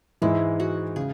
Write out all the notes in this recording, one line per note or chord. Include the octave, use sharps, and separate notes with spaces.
G#2 E3 G#3 E4
F#4
C#3 G#4